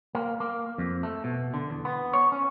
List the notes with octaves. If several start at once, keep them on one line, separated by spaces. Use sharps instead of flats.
A#3
A#3
F2
A3
B2
D3
E2
B3
C#5
C#4